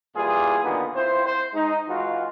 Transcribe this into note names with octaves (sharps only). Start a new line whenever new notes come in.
A#2 E3 G3 F4 G#4
A#2 D3 D#3 B3
C4 E4 F4 C5
C5
G#3 D#4
E3 G#3 F4 F#4